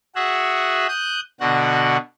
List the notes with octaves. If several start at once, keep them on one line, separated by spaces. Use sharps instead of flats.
F#4 G#4 E5 F#5
D#6 F#6 G6
B2 D3 F#4 F#5